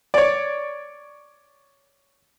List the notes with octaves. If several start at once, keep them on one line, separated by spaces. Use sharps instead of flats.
C#5 D5